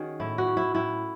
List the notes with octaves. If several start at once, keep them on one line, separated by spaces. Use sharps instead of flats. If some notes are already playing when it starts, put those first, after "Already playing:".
Already playing: D#3 C#4 F#4 G#4
A2 E4
F#4
A2
E4
A2 E4